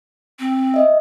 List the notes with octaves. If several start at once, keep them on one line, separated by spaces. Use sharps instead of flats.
C4
D#5 E5